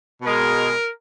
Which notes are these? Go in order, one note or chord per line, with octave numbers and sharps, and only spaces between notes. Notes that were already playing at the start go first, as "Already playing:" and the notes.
B2 G#3 A#4